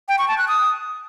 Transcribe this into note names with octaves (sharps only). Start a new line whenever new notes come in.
G5
C#6
A5
F#6
D#6